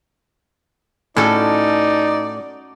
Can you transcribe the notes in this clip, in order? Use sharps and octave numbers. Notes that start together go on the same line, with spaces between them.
A2 C#4 D#4 F#4 A4 D5